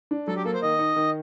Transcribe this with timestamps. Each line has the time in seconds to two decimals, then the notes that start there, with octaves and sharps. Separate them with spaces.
0.11 D4
0.28 F#3 A4
0.36 G4
0.45 A#3 A4
0.54 C5
0.62 D#3 D#5
0.79 D#4
0.96 D#3